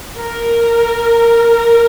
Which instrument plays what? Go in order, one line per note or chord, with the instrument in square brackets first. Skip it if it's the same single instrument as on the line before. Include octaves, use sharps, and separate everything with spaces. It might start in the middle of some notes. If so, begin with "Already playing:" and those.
[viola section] A#4